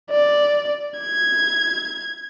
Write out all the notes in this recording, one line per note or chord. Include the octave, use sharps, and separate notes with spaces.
D5
G#6